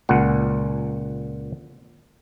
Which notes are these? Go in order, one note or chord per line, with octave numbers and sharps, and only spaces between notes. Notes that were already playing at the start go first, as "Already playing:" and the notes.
C#2 A#2 F#5